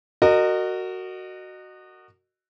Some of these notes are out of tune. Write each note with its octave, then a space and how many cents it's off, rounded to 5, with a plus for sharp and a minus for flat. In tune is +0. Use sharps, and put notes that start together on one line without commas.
F#4 +5 A#4 -25 D#5 -25